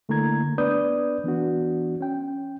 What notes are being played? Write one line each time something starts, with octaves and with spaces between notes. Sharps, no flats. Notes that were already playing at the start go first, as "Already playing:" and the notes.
D3 A3 A#3 E4 A#5 G#6
B3 D4 B4 D5 D#6 G6
E3 B3 D4 F#4
C#4 G5